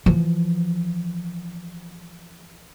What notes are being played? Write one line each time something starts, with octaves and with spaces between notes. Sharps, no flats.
E3 F3